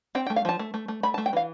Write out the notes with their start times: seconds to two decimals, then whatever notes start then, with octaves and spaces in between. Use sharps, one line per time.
0.15 C4 G5
0.27 G5
0.30 A3
0.36 F5
0.45 F3 A5
0.59 A3
0.74 A3
0.88 A3
1.03 A3 B5
1.14 A5
1.18 A3
1.26 G5
1.33 E3 F5